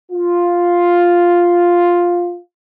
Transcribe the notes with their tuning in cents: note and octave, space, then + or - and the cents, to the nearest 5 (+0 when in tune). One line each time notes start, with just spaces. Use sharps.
F4 +5